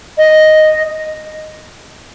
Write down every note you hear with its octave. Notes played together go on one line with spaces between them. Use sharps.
D#5